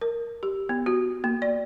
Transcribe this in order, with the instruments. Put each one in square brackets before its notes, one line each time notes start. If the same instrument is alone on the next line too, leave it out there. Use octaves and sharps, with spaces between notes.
[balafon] A#4
G4
B3
F#4
A#3
D5